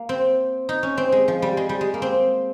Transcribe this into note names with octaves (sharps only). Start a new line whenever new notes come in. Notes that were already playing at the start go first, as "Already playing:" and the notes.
Already playing: A#3
C4
D#4
C#4
C4
G#3
F3
G3
G#3
G3
G#3
A#3
C4